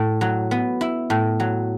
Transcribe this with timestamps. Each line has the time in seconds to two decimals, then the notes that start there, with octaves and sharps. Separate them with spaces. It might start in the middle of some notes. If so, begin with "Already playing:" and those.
Already playing: A2
0.21 F#3
0.51 B3
0.81 E4
1.10 A2
1.40 F#3